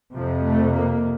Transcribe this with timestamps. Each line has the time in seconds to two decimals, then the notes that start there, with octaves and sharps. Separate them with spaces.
0.15 F2 C3 F3
0.45 A3
0.73 A#3